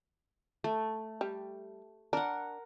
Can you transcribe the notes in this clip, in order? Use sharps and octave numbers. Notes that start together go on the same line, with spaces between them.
A3
G3
D4 A#4 F#5